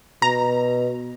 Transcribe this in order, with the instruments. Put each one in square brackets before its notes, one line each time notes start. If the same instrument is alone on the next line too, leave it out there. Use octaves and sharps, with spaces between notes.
[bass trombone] B2 [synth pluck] A#5